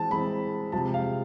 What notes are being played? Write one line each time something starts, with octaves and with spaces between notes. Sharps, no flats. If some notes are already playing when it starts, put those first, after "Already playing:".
Already playing: E3 G#3 C4 A5
E3 G#3 C4 B5
C3 F3 G#3 A5
F5